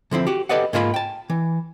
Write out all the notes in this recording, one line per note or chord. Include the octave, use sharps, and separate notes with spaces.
D3 F3 C4 E4
F#4 G4
G4 A4 B4 D5 D#5 F#5
G#2 G#3 A#3 F4 C5 B5
G5 A5
E3